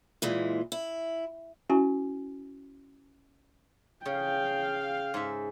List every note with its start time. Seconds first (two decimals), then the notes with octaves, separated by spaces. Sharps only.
0.22 A#2 E3 G#3
0.72 E4
1.70 C#4 E4 F#4 G#5
4.05 C#3 F5 G5
5.14 G#2 E5